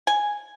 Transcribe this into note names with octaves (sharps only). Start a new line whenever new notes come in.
G#5